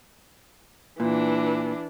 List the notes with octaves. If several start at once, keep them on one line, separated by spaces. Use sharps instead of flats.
A#2 E3 D4